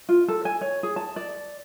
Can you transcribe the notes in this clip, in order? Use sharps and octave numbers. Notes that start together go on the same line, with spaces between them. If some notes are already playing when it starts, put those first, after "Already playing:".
F4
A4
G#5
C#5
G#4
A5
D5